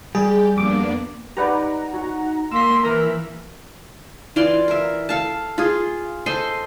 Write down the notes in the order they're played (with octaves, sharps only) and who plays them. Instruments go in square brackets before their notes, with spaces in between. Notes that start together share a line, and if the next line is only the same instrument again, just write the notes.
[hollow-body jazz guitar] G3 [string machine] G4 [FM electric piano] G#4
[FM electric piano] F2 D6 [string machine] A#3 B3 D4
[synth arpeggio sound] D#4 F#5 A#5 [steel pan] G4 B4 D5
[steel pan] F#4
[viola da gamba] A#3 [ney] C6 [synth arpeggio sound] E6 B6
[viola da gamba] E3 [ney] A#4 [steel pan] A#5
[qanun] E3 F4 D5 C6
A#4 E5
A4 F5 A5
F4 G#4
A4 C5 D#5 C6